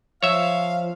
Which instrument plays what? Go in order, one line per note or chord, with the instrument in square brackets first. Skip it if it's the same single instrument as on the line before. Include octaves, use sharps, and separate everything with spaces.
[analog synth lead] F3 [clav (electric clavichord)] C#5 E5 [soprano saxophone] F5